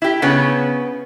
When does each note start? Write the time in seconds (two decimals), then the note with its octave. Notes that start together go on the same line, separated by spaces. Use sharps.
0.02 E4 G4
0.22 C#3 B3 C#4